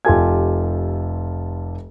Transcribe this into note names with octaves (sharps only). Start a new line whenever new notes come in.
F1 F4 G4 A4 G#5 G#6